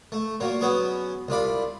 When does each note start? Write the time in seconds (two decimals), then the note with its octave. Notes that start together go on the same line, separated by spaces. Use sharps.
0.12 A3
0.40 A#2 F#3 A#3
0.61 F#3 B3 C#4 G#4
1.28 C2 F4 D5 B5